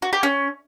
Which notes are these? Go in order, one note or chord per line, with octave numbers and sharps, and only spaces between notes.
F#4
G4
C#4